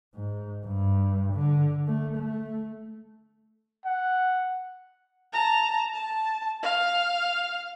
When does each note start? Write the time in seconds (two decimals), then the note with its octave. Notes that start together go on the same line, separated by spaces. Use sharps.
0.15 G#2
0.66 G2
1.34 D3
1.88 A3
2.16 A3
3.85 F#5
5.33 A5 A#5
5.94 A5
6.63 F5